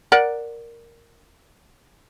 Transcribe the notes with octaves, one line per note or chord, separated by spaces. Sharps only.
A#4 D5 F#5